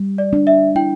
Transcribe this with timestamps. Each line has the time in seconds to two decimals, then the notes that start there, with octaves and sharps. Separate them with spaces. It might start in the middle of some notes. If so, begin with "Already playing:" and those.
Already playing: G3
0.18 D5
0.33 D4
0.47 E5
0.75 E4 G5